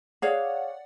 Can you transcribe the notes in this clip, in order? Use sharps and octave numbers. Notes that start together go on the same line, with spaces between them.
G#4 C#5 D5 F5 F#5